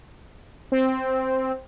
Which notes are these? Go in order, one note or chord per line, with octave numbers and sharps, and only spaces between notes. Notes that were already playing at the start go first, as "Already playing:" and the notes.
C4